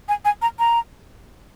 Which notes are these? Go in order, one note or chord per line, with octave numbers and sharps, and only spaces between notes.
G#5
G#5
A#5
A#5